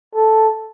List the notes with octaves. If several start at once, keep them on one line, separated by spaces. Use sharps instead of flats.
A4